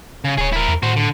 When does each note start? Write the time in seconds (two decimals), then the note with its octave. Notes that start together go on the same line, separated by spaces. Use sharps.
0.24 C#3
0.38 D1 G#4 C#5
0.53 E4 A#4
0.68 E2
0.83 A2 F#4 C5
0.96 D3